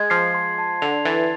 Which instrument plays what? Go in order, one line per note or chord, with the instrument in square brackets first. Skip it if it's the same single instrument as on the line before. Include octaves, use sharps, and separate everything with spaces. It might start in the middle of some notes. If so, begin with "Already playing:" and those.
Already playing: [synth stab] G#3 [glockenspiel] G#6
[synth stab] F3 [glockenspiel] C7
[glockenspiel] C6
A5
[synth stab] D3 [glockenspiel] F7
[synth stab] E3 [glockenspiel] A6